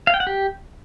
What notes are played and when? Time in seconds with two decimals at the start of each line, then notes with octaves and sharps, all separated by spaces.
0.07 F5
0.14 G5
0.20 F#5
0.27 G4